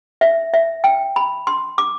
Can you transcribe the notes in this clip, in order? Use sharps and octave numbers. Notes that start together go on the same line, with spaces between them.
E5
E5
G5
B5
C6
D6